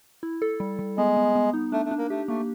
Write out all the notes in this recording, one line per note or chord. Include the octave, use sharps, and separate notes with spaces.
E4
A4
G3
G3
G#3 B3
B3
B3
D#4
A3 D4
A3
D4
A#3
A3 G4
A3 A#3